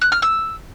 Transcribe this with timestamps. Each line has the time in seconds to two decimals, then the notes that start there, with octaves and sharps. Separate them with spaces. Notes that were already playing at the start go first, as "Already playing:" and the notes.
0.01 F#6
0.12 F6
0.22 E6